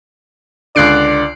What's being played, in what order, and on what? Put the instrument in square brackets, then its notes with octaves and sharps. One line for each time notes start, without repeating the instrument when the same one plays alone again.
[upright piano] C#2 D3 [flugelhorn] D5 [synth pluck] F#6 C7 D7